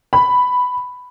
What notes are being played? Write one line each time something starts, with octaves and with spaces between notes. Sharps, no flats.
B5